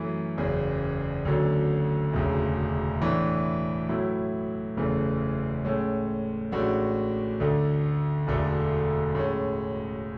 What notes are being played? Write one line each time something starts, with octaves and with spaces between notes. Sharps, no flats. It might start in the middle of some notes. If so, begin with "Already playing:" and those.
Already playing: F#2 E3 A3 C#4
F#1 E2 C#3
D2 D3 F#3 C#4
E1 D2 C#3
A2 E3 B3 D4
A2 F#3 B3 E4
F#1 E2 C#3 E3 A3
A2 G#3 C#4
A1 A2 G#3 D4 F#4
D2 D3 A3
E1 D2 D3 A3
A2 G#3 C#4